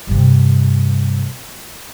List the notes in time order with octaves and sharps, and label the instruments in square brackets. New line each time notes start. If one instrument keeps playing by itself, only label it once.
[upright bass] G2 C3